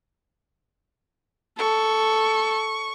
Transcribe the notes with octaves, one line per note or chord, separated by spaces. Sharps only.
A4 C#6